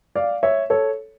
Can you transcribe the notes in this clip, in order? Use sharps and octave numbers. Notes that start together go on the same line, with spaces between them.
D5 F5
C#5 E5
A4 C#5